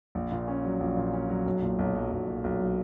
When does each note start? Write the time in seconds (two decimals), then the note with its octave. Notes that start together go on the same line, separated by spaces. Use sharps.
0.15 A#1
0.32 A#2
0.48 C#4
0.65 F#3
0.80 A#1
0.97 A#2
1.13 C#4
1.29 F#3
1.46 B1
1.62 A#2
1.79 B1
1.95 F#3
2.12 B1
2.28 A#2
2.44 B1
2.61 F#3